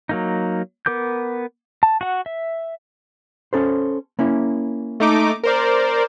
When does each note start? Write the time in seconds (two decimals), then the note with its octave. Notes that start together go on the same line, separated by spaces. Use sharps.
0.09 F#3 A#3 D#4
0.86 B3 A#4 D6 G6
1.83 A5
2.01 F#4 F#5
2.26 E5
3.53 C#4 A4 C5
4.19 A#3 C#4 E4
5.00 A3 D#4 D6
5.44 A#4 C5 D5